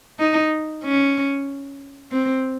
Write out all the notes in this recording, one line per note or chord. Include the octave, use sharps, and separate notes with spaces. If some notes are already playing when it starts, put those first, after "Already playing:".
D#4
C#4
C4